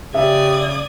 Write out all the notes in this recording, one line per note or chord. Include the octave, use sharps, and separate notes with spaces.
C#3 G4 D5 E5 D#6 G#6